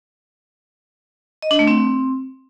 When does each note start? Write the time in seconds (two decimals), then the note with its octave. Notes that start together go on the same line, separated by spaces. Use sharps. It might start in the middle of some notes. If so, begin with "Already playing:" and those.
1.42 D#5
1.51 D4
1.59 A3
1.67 C4